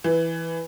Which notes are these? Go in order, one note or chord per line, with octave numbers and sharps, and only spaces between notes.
E3